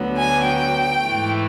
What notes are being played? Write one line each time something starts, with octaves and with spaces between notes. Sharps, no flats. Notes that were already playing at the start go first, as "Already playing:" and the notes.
Already playing: D2 D3 F#3 B3
G#5
G5
G#2 E3 A3